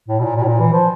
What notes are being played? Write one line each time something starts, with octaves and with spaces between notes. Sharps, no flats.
A2
B2
A#2
A#2
A2
A#2
E3
F3